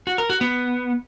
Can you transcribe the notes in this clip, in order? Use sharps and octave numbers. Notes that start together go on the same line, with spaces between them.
F#4
A#4
F#4
B3